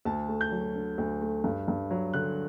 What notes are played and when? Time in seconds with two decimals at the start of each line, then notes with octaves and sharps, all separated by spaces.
0.05 D2 A5
0.29 A3
0.41 G6
0.52 F#3
0.75 D3
0.98 D2
1.22 A3
1.44 G2
1.68 G2
1.91 F#3
2.14 D3 F#6